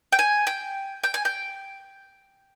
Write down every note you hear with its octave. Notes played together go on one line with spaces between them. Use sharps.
G5
G#5
G5
G5
G#5
G5